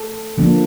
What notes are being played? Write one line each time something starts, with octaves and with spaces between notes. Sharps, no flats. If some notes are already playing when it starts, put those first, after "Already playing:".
Already playing: A4
D3 F3 A#3 D4